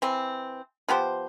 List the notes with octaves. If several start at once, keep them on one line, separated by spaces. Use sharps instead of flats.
E3 C4
F3 B3 G4 C5